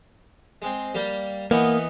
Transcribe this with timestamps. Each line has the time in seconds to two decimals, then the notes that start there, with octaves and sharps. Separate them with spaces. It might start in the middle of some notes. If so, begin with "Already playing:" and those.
0.62 G#3 C4
0.94 G3 A#3 G4
1.51 E3 A#3 B3 D#4